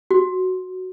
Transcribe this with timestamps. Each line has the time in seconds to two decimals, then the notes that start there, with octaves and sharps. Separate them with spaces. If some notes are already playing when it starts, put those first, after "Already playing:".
0.11 F#4